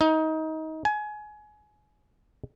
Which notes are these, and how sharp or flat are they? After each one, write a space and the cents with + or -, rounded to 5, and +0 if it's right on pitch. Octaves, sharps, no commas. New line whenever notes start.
D#4 +25
G#5 +25